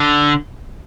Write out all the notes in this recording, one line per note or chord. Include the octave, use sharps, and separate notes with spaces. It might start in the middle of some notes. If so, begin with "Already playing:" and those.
Already playing: D3